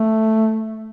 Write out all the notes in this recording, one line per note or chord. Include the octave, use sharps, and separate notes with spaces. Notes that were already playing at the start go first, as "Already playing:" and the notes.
Already playing: A3